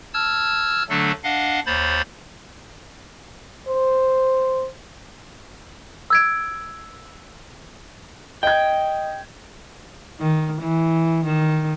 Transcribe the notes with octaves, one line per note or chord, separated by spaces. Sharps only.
A5 E6 F6 G#6
D3 F#3 A3 D4 A4
D4 D#5 F5 F#5
D#2 C5 C#5 B5 A6
C5
E6 G#6 D7
D#5 G5 G#6
D#3
E3
D#3